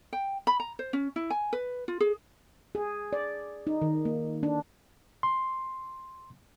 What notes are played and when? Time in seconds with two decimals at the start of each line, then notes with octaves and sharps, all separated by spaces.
0.13 G5
0.47 B5
0.60 A#5
0.79 C5
0.93 C#4
1.16 E4
1.30 G#5
1.53 B4
1.88 F4
2.00 G#4
2.75 G#4
3.13 D5
3.67 D#4
3.82 D#3
4.05 A#3
4.43 D4
5.23 C6